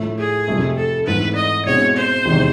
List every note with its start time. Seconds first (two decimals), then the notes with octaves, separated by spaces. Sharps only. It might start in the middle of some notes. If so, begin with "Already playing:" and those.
Already playing: A2 F3 A3
0.18 G#4
0.48 F2 C3 F3 A3
0.77 A4
1.06 G#2 E3 A3 C4 B4
1.36 D#5
1.66 B2 G#3 C4 E4 C#5
1.96 C5
2.25 E2 C3 D#3 G#3